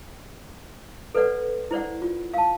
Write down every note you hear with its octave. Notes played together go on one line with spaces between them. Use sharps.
A4 B4 C5 D5 F#5
E4 C5 D5 F#5
F4
F5 A5